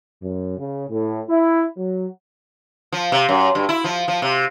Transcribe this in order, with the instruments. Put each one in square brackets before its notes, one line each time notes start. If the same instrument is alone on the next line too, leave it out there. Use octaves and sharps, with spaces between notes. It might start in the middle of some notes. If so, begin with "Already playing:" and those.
[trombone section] F#2
C#3
A2
E4
F#3
[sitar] F3
C3
F#2
G2
E4
F3
F3
C3